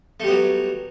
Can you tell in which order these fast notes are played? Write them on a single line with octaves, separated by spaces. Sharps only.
A3 G3 B3 F#3